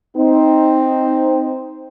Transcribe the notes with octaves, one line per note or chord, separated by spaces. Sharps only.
C4 D#4